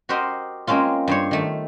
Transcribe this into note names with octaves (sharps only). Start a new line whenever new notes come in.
F#4 G4 A#4 C5 D#5
G#3 A#3 C4 C#4 F4
G2 C5 C#5
D#3 A3